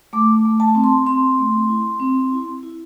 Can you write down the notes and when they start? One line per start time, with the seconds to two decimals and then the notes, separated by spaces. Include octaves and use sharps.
0.13 A3 D6
0.45 A3
0.60 A5
0.75 C4
0.84 C6
1.06 C4 C6
1.38 A3
1.69 E4
2.00 C4
2.32 E4
2.63 E4